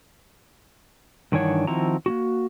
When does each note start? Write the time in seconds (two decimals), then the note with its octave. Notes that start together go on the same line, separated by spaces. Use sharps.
1.32 G2 D#3 E3 D4 C#5 F#5
1.67 D#3 F3 C4 E4 F#4 A#5
2.06 A#3 B3 F#4